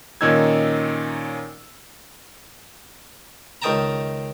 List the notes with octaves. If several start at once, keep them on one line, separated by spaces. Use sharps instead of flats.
A#2 D#3 C#4 D#4 E6 G#6
C#2 D#3 D#5 G5 A5 A#5